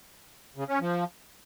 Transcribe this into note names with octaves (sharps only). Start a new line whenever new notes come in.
C#3
C#4
F3